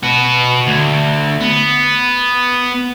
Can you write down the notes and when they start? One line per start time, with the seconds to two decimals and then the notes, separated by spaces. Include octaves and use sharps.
0.03 F#4 B4
0.67 D2
1.41 B3